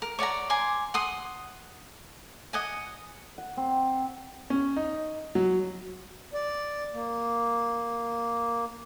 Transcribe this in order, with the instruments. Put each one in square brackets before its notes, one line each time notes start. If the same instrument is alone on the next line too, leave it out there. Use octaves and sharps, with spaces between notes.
[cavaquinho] A#4
C#5 D5 F#5 A#5
G#5 A#5 C6 D6
F#5 C6 D#6
D#5 F#5 G#5
[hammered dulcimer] F#5
C4
[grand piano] C#4
D#4
F#3
[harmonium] D5
A#3